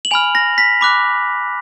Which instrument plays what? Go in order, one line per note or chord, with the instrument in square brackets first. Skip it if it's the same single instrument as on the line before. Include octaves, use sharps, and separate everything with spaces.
[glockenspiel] F#7
G#5 B5 F6 F7
A#6
B6
B5 D6 F#6